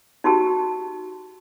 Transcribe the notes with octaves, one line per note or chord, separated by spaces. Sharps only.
D#4 F#4 G4 A5